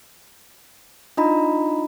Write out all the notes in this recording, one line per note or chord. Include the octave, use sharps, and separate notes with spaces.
D4 D#4 F4 D#5 A#5 B5